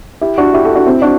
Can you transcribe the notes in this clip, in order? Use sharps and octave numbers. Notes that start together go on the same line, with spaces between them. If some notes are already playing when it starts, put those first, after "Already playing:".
E4 G4
D4 F#4
E4 G4
F#4 A4
D4 F#4
C4 E4
D4 F#4